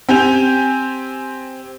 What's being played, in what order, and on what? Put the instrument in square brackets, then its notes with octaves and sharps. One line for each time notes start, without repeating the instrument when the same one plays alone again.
[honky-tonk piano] C4 G4 G#5 G6 F7